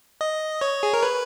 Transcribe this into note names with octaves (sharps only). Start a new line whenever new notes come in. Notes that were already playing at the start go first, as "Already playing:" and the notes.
D#5
C#5
G#4
A#4
B4